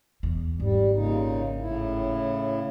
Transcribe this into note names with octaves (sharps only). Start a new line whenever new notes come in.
E2
G#1 G3
A#2 C#3 D#4
A2 C#3 E4